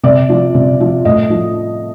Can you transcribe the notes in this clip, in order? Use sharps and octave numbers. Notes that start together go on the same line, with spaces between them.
C3 D5
F3
C3
F3
A2 D#5
F3